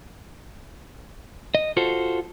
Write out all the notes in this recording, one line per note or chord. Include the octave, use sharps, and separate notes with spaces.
D#5
F4 F#4 A4 C5